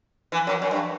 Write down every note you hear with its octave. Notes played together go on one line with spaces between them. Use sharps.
E3
F#2
F#2
G2